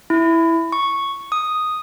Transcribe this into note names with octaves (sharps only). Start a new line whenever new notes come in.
E4
C#6
D#6